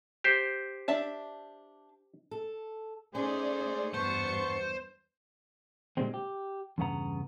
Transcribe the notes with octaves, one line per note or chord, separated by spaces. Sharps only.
G4 C5
D4 E5 A5
A4
A3 C#4 D#4 G#4 C5 D5
E2 G2 B3 C5 A5 C#6 C#7
A#2 D3 G3 G#3 C4
G4
E2 G2 C#3 B3 F#5 A#5